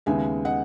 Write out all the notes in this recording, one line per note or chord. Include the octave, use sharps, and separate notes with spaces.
D#2 C#3 G#3 B3 E5 G#5
D#5 F#5